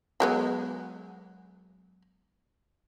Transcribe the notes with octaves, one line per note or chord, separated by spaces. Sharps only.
F#3 G#3 B3